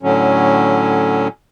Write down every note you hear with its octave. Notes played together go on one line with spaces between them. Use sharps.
A2 D3 F#3 C#4